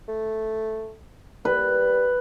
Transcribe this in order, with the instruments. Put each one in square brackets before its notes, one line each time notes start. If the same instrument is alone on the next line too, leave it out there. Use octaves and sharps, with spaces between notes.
[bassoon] A3
[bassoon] G3 [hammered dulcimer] B4